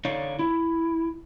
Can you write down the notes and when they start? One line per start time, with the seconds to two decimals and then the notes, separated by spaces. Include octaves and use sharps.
0.05 D3 D#4 C#5 D5 F5
0.39 E4